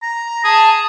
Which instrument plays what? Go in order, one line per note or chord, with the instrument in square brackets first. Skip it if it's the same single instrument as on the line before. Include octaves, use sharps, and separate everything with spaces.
[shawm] A#5
[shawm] G#4 [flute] A5